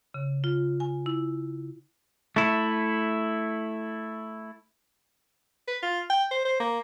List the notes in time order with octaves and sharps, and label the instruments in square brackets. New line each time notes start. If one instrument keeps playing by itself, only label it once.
[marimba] C#3
F4
G#5
E4
[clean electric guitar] A3 E4
[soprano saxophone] B4
F4
G5
C5
C5
A#3